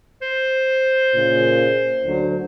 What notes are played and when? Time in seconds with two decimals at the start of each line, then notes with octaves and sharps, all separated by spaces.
0.22 C5
1.14 A#2 C#3
2.04 D2 D3 F#3